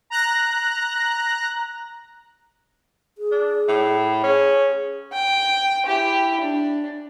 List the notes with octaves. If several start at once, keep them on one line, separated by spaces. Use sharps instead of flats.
A#5 F#6 A#6
G#4
D4
A2
C#4 G#4
G5
E4 G4
D4